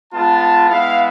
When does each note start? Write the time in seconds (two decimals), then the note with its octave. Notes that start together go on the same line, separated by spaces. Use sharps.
0.13 G#3 B3 F4 A5
0.69 G#3 B3 E4 F5